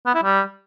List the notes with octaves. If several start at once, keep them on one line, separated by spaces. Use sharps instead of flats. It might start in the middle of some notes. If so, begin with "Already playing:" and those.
B3
E4
G3